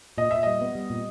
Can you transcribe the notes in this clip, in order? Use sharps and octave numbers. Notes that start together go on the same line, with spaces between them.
A#2 D#5
A#2 E5
G3 D#5
B3
G3
A#2